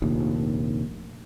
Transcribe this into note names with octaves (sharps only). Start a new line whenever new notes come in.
F1 A#1 D#2